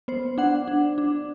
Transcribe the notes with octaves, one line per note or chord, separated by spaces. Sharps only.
B3 C5
D4 F#5
D4
D4